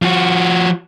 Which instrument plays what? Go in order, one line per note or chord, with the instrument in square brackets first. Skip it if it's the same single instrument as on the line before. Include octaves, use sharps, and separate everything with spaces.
[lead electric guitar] F3 F#4